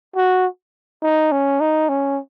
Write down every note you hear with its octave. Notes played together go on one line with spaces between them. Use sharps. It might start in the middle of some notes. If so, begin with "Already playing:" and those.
F#4
D#4
C#4
D#4
C#4